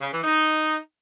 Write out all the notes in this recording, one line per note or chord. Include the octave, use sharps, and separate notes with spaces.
C#3
E3
D#4